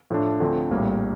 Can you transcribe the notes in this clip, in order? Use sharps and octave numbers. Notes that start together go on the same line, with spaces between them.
A2 F3 A3 D4
D2 D3 F3 C4
A#1 A2 G3 A#3